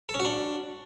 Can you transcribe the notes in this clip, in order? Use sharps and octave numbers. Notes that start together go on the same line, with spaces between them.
A4
C#4
F#4
D4